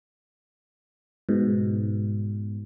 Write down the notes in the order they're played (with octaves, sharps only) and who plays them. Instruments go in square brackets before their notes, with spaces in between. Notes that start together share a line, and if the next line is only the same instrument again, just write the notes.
[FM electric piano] G#2 B2